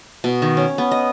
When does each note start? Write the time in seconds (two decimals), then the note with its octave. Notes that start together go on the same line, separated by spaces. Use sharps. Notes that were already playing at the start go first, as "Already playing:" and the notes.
0.24 B2
0.42 D#3
0.57 C#4
0.78 B3
0.91 D#5